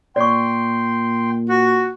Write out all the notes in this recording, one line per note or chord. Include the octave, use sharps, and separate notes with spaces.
A#2 D5 G5 C6 C#6
F#4